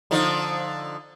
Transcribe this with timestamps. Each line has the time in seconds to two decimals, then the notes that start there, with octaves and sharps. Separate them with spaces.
0.11 D3 F3 D#4